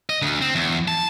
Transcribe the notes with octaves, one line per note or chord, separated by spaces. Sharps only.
D#5
D2
C4
E2
A5